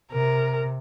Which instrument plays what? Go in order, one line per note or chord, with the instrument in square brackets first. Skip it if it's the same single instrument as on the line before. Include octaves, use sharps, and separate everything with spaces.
[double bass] C3 [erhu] A#4